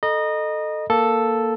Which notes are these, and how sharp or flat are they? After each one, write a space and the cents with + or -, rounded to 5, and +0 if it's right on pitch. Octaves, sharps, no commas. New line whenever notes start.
A4 +0 D#5 -20 A#5 +40
A#3 +0 A4 +0